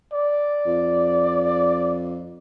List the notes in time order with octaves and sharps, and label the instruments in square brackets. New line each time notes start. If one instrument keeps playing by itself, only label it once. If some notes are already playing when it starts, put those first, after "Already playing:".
[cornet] D5
[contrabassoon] F2